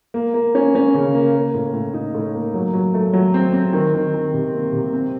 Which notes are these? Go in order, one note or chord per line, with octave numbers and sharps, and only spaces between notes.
A#3
A#3
C#4
C#4
C#3
A#3
A#3
A2
A2
D#4
A2
A#3
F#3
F#3
A3
F#3
C4
C4
D#3
D#3
D#3
C3
A#3
C3
C4